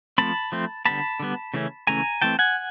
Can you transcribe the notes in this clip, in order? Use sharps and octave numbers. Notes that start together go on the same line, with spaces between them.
F3 A3 C4 A5 B5
F3 A3 C4
D3 G3 B3 A5 B5
D3 G3 B3
C#3 E3 A3 C#4
C#3 E3 A3 C#4 G#5 A#5
E3 A3 C4 G5 A5
F#5 G#5